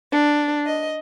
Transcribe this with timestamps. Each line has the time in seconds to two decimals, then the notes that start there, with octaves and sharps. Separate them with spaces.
0.11 D4
0.66 D#5